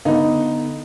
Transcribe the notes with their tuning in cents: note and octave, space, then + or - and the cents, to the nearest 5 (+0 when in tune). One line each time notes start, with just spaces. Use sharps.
D3 +0 B3 +0 D#4 +0